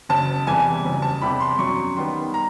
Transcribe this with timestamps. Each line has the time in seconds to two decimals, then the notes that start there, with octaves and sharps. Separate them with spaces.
0.09 F#1 A5
0.47 E2 C3 E3 G3 G#5
0.84 F#1
1.02 A5
1.22 E2 C3 E3 G3 B5
1.40 C6
1.59 F#2 C#6
1.96 D#3 G3 B3 C6
2.34 A#5